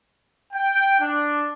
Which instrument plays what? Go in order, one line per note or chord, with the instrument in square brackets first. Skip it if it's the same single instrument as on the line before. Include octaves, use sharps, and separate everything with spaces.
[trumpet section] G5
D4